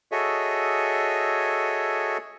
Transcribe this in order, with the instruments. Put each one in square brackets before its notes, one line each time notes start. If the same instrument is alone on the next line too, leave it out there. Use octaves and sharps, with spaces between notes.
[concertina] F#4 G#4 A4 C#5 D#5 E5